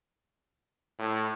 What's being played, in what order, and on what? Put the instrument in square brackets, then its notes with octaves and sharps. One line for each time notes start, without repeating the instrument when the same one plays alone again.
[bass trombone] A2